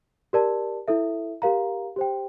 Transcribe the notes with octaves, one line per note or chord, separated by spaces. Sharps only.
G4 A#4 D5 A5
E4 A4 E5
G4 A#4 F5 A#5
G4 C5 G5